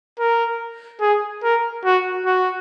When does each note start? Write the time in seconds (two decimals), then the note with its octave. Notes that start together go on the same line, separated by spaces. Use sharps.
0.19 A#4
1.01 G#4
1.44 A#4
1.85 F#4
2.25 F#4